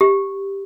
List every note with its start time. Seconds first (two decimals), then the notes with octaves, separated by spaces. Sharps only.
0.01 G4